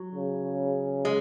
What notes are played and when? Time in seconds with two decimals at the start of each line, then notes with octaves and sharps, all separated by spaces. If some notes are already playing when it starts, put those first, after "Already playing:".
Already playing: F#3
0.15 C#3
1.05 G#3